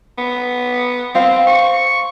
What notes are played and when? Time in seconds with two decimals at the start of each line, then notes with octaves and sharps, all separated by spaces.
0.18 B3
1.15 C4 C5 F5
1.47 C#6